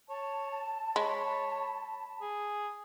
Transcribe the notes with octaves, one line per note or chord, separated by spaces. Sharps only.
C#5 A5
G#3 C#5 B5
G#4